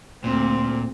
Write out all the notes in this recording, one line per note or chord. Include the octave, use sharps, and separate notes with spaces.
D2 A#2 C4